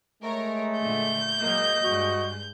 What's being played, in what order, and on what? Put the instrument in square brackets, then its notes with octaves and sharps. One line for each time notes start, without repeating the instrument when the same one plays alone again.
[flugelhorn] G#3 [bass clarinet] A3 [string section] A#4 C#5
[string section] A#2 D3 [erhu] G6
[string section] F#3 G#3 A#3 [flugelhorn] D#5
[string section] G2 G#3 [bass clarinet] F#4